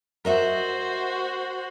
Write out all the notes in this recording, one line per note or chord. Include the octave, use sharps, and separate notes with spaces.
F#4 A#4 C5 D#5 E5